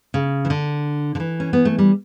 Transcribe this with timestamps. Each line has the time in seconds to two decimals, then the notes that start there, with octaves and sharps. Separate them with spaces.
0.14 C#3
0.45 E3
0.50 D3
1.15 D3
1.20 E3
1.40 C#4
1.53 B3
1.65 A3
1.78 G3